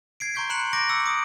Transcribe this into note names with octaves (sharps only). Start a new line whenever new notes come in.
G#6 C7 D7
A#5 C6 C#6 G6 G#6 B6
B5 C6 F#6 C#7 E7 F#7
C#6 D6 G6 A#6 D7
D6 E6 A#6 C#7 D7
D#6 D7